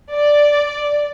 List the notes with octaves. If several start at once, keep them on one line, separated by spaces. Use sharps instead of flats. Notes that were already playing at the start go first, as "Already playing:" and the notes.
D5